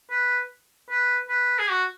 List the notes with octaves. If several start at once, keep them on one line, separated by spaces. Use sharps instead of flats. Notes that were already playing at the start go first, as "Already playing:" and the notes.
B4
B4
B4
G#4
F#4